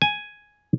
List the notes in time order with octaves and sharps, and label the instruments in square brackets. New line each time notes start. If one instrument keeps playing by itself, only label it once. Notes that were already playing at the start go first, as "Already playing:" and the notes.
[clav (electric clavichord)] G#5